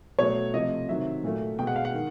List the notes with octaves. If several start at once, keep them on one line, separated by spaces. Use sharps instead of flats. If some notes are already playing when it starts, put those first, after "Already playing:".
B2 F#3 A3 C#5
C3 F3 A3 D#5
C3 D#3 F#3 E5
A#2 F#3 A3
B2 G#3 G5
F#5
F5
F#5
D#3